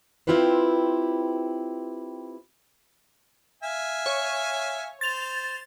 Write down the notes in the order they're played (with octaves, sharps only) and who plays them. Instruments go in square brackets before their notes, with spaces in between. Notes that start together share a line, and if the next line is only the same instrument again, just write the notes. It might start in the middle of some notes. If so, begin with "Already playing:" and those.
[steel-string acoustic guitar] C4 E4 F4 G4 B4 C5
[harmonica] E5 F5 G#5
[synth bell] C#5
[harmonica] C5 [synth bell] A6 F7